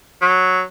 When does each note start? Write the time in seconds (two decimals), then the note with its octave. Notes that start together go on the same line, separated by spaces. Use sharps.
0.22 F#3